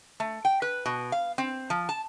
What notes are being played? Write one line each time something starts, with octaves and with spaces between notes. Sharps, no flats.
A3
G5
B4
B2
F5
C4
F3
A5